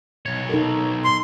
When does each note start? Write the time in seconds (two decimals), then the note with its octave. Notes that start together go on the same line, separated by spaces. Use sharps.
0.26 B1 C#5
0.49 D#4 A4 A#4
1.05 C6